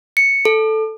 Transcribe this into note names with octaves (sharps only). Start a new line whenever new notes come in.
C#7
A4